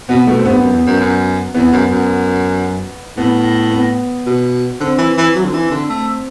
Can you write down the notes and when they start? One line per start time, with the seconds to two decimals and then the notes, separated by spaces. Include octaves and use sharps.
0.09 B2 B3
0.27 B2 A3
0.39 C4
0.45 G2 B3
0.58 F#2
0.72 E2
0.86 F#2
1.00 F#2
1.54 E2 B3
1.72 F#2
1.91 F#2
3.17 A2 B3
3.71 B3
4.26 B2
4.80 D3 C4
4.98 E3
5.17 E3
5.35 F#3
5.45 D3
5.53 E3
5.71 D3
5.89 A3